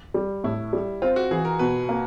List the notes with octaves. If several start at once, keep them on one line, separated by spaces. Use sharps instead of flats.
G3
A2 E4
G3
C4 F4
F#4
E3 G#4
A#4
B2 B4
A#3